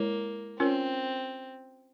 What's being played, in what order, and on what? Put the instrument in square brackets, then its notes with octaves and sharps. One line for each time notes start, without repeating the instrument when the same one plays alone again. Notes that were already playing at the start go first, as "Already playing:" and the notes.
Already playing: [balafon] G#3 E4 C#5 [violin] A#3
[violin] C4 [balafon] C#4 F4 A#4 C#5